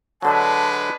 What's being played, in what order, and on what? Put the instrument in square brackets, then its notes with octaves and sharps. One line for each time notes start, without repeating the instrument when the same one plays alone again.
[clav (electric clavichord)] D3 F#3 [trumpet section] G#3 D4 B4 [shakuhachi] A5